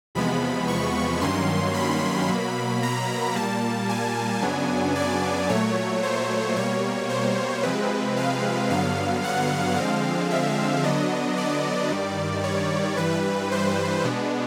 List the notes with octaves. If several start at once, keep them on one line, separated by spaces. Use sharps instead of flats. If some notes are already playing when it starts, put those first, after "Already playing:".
E2 C3 F3 G#3 B3 B5
C#6
G2 D#3 F#3 A#3 C#4 C6
B5
B2 F#3 A#3
A#5
A#2 G3 A#3 A5
G#5
F#2 C#3 F#3 B3 D4
D5
A#2 F#3 A3 C#5
C5
B2 G3 A#3 C#5
C5
C3 F3 G#3 C4 B4
F5
G2 D3 F#3 B3 F5
F#5
D3 F3 G#3 C4 F5
E5
D3 F#3 B3 D4 D#5
D5
G2 D#3 G3
C#5
G2 E3 G3 B4
C5
B2 G#3 B3 D4